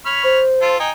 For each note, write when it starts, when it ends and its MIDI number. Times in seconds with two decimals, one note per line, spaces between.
0.06 0.40 73
0.06 0.40 83
0.06 0.40 89
0.24 0.76 72
0.61 0.76 65
0.61 0.76 69
0.80 0.90 63
0.80 0.90 79
0.80 0.90 80